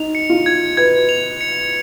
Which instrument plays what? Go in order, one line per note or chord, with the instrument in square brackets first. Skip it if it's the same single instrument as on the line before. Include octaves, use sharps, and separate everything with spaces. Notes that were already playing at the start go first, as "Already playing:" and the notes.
Already playing: [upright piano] D#4 [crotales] F7
[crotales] C#7
[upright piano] F4
[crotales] G#6
[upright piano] B4 [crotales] G#6
[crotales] F7
C#7